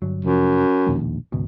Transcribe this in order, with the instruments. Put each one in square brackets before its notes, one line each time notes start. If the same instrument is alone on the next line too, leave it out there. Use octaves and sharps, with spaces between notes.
[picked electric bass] G1 F#3
[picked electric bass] F1 F3 [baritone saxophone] F#2
[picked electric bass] E1 A#1 D#2
G#1 C#2 B2